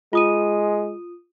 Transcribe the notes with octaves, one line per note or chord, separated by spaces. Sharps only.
G#3 F4 D#6 D#7